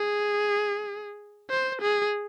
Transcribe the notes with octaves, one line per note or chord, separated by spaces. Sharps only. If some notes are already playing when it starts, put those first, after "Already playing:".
Already playing: G#4
C5
G#4